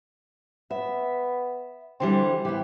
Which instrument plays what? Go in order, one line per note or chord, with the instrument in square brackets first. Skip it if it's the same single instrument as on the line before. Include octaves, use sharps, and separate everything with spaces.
[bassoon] B3 [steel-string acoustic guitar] E5
[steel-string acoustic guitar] D3 E3 G3 [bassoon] C4
[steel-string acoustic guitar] E3 B3 [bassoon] G4